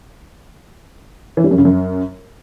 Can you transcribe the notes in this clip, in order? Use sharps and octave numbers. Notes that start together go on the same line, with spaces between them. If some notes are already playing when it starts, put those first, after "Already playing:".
E3
G3
F#2
C#3
F#2